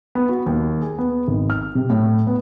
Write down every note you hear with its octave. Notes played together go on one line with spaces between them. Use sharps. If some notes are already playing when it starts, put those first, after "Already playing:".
B3
F#4
D#2
G#4
B3
G#1
F6
C3
A2
B3